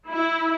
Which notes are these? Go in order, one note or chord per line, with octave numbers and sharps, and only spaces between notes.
E4